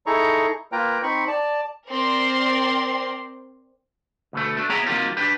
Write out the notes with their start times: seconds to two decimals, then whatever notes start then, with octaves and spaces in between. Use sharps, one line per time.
0.06 D#4 E4 G#4 A4 A#5 C#6
0.72 A#3 F4 B4 G5 A#5
1.03 C4 D#4 B5 C#6
1.28 D5 A5
1.89 C4 A#4 D5 C6
4.33 D2 B2 A3
4.57 A3 D4
4.69 B3 G#4 C#5 E5 G5 A#5
4.86 D#3 F#3 A#3 C4 F4 G4
5.17 D4 G4 B4